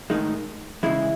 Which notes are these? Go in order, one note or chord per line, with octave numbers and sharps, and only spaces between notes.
A2 D#3 G#3 D#4
C#3 E3 G#3 E4